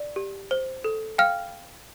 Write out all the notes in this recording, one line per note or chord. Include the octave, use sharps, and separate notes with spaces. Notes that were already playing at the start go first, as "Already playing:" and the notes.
Already playing: D5
G4
C5
A4
F5 G5 F6